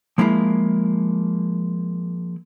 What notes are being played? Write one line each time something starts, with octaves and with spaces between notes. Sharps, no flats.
F3 G#3 A#3 E4